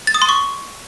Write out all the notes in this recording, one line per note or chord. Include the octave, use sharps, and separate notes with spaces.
A6
D#6
C6
C#6